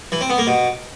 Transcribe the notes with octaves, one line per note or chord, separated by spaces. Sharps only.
E3
C4
B3
A#3
B2